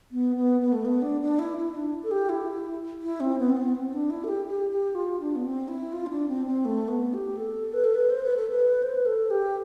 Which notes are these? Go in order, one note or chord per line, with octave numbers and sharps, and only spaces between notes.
B3
B3
B3
A3
B3
D4
D4
E4
E4
D4
A4
G4
E4
E4
C4
B3
C4
B3
C4
D4
E4
A4
G4
G4
G4
F4
D4
B3
C4
E4
F4
C4
D4
C4
C4
A3
B3
G4
A4
B4
A4
B4
C5
B4
A4
B4
C5
B4
A4
G4